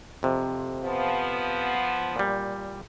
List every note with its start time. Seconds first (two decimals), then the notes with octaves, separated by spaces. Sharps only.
0.23 F2 C3
0.83 F3 B3
2.16 A#2 G3